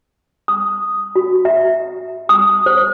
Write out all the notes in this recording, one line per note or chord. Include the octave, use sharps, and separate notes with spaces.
D#6
F#4
E5
D#6
C5